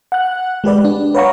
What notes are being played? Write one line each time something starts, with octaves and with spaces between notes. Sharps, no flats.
F#5 F#6
G#3 G4 B4 D5
D4
B4 C#5 F5 F#5 A#5 C#6